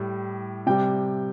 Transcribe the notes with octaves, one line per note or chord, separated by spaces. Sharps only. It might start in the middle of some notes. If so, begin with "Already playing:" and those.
Already playing: A2 G3
C3 G3 G5